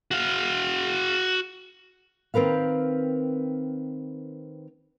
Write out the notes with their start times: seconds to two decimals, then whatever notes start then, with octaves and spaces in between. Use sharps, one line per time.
0.11 F#4 F5
2.34 D#3 C4 A#4 B4 F5